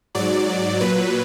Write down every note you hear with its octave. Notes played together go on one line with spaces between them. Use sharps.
G#2 F#3 D5
A#2 F#3 B4